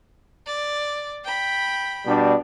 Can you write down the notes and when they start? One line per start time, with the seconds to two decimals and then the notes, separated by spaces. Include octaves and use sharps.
0.47 D5
1.25 G5 B5
2.06 B2 G3 D4